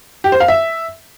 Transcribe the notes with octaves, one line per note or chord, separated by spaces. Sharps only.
G4
C5
F5
E5